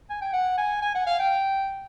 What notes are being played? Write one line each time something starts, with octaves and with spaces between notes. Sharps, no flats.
G#5
G5
F#5
G#5
G#5
F#5
F5
G5